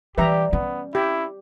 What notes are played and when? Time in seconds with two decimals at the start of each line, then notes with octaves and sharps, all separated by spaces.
0.18 E3 G3 G4 B4 E5 A#5
0.53 B3 C#4
0.95 E4 G4